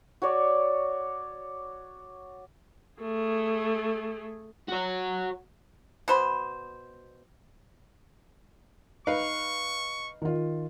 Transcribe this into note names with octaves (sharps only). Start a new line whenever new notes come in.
F#4 C#5 D5
A3 G#4
F#4 C#5
B2 C5 B5
D#4 B4 F5 C#6
D#3 F4